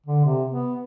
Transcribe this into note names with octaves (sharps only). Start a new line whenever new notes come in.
D3
C3
B3